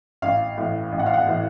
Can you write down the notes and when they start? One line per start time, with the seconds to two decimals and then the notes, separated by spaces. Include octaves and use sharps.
0.22 A1 F5
0.58 A2 E3
0.92 A1
0.99 F#5
1.06 F5
1.14 F#5
1.26 A2 E3